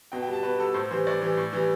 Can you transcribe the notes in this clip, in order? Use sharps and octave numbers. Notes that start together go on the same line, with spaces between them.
B2 G5
G5
G3
A5
B2 B4
G3 A4
A2 C5
E3 G3 C5
A2 D5
E3 G3
A2
E3 G3